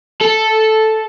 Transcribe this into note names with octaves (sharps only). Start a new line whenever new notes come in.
A4